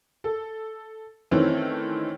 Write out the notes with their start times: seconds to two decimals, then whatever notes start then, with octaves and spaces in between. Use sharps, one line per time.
0.24 A4
1.31 D#3 E3 A3 C4 C#4